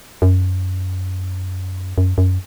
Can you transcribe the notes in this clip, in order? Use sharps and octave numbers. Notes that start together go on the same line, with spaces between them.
F#2
F#2
F#2